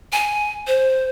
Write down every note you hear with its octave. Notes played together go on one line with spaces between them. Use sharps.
G#5
C5